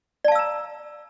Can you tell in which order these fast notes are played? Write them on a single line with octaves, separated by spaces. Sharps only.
D5 A5 F5 E6 A#5